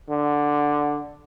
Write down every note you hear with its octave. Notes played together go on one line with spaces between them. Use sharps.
D3